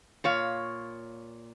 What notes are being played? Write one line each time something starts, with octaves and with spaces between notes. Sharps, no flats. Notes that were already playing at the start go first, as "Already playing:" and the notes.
A#2 C#5 F5